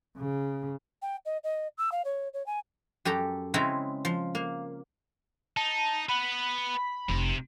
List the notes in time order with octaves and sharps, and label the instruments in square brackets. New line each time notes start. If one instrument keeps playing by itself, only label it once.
[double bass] C#3
[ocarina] G5
D#5
D#5
E6
F5
C#5
C#5
G#5
[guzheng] F#2 G4 A4 A#5
C#3 G#3 C4 E4 C#5 A#5
F3
A#3
[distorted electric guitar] D#4 [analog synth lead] A5
[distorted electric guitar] B4 F#5 [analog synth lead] B5
[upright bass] F1 [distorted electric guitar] C3